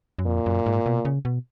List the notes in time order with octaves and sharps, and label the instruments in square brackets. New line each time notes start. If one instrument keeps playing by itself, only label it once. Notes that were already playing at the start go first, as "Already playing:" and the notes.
[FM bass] F#2
[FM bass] F2 [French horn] A#2
[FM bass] F#2
G#2
B2
C#3
B2